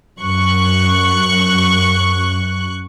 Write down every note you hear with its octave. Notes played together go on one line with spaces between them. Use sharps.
F#2 C#6 F#6